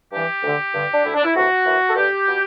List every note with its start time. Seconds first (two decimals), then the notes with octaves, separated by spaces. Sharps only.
0.12 G2 E3 G4
0.43 D2 D3
0.73 G2 D3
0.94 D4
1.04 D2 D3 E4
1.14 D4
1.24 E4
1.35 D2 C3 E3 F#4
1.65 F#2 E3
1.89 A4
1.95 G2 D3 G4
2.28 B2